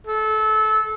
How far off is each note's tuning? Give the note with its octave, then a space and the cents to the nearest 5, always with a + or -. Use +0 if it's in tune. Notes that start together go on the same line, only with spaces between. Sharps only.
A4 -25